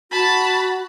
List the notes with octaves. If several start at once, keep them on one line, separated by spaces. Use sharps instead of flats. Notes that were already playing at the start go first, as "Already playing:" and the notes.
F#4 A5 B5